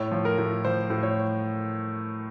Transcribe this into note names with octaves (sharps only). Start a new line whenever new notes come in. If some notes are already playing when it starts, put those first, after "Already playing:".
Already playing: A2 C#5
F3
A#4
A2
F3 C5
A2
C#5